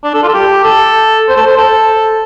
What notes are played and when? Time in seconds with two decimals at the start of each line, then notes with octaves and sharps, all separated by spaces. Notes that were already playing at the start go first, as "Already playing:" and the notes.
0.04 D4
0.14 A4
0.23 F4
0.28 A4
0.34 G4
0.64 A4
1.29 C5
1.36 A4
1.46 C5
1.57 A4